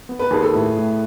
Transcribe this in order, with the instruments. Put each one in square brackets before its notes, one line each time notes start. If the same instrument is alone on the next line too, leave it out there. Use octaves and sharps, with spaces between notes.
[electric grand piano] B3
[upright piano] B4
[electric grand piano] D#2 [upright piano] G#4
[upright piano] A4
[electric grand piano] A2
A2